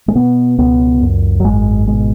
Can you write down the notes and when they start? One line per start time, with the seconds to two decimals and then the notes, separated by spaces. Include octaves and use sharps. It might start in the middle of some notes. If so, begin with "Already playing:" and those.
0.08 G#3
0.15 B2 B3
0.58 C#2 B3
1.01 F#2
1.40 F#3
1.44 G#1 G#3
1.87 B2 G#3